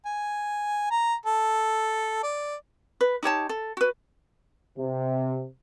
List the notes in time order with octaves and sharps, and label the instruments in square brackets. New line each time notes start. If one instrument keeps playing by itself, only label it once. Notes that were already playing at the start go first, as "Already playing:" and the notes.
[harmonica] G#5
A#5
A4
D5
[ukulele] B4
D#4 G4 C#5 A5
A4
F#4 B4
[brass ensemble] C3